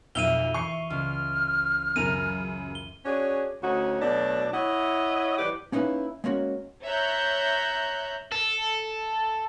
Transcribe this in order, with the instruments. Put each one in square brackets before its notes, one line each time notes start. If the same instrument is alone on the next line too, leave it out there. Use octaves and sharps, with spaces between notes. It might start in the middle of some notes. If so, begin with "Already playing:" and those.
[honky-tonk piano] B1 F2 [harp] E5 F5 [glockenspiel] D#7 F7 G7
[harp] E3 [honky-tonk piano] C#6 C7 C#7
[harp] C#2 [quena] F6
[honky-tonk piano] F#2 C#3 F7 [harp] A#4 [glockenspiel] D#7
[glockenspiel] G7
[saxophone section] C#4 D4 F#4 G#4 C#5
D2 C#4 D#4 F#4
B2 F#3 A3 D4
E4 C#5 D#5 E5 F#5
E3 G3 G4 B4
[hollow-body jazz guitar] A#3 C#4 D#4 E4 B4 F5
G#3 A#3 C#4 F#4
[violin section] C#5 E5 A#5 F#6 G6
[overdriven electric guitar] A4